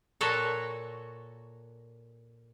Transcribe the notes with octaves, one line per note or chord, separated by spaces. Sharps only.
A#2 F#4 A4 C#5